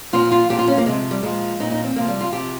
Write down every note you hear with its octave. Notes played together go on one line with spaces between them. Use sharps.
A#2 F3 F4
F4
A#2 F3 G4
F4
C#4
A#3
C3 F3 G#3
G3
A#2 F3 G#3
A#2 F3 D#4
D#4
C4
C3 F3 A#3
G3
F4
C3 F3 G4